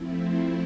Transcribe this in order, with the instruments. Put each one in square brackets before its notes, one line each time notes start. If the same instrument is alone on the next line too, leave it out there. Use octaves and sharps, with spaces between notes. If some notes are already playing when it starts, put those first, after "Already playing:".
Already playing: [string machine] F3 A3 C4 E4